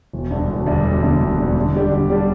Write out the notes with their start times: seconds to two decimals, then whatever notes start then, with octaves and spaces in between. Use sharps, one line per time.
0.13 E1
0.30 D2 D3 G3
0.49 E1
0.66 D2 D3 G3
0.84 E1
1.03 D2 D3 G3
1.20 E1
1.38 D2 D3 G3
1.57 D3
1.74 G3 D4 G4 D5
1.91 D3
2.10 G3 D4 G4 D5